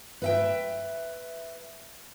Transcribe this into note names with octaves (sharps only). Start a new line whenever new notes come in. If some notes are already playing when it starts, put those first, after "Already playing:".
B4 E5 G5